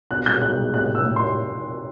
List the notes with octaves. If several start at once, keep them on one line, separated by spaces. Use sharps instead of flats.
B1 F#6
G#3 G6
B1 F#6
G#3
A2 F#6
A2 E6
A2
C6